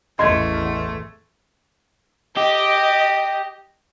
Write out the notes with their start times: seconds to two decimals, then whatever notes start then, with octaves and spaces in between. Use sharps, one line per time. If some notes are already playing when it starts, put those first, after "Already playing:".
0.19 A1 E2 A3 D#5 C6 G#6
2.37 G4 D#5